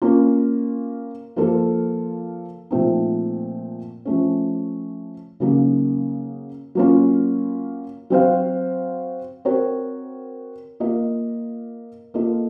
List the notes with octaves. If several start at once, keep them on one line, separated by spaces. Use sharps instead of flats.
A#3 C#4 F4 A#4
F3 A#3 F4 A4
A#2 F3 A3 C4 D#4
F3 A3 C#4
C#3 F#3 A#3 D#4
F#3 A#3 C#4 F4
F#3 C4 F#4 C5 F5
C4 F#4 A#4 C#5
A#3 F4 A#4 D#5
A#3 F4 A4 D#5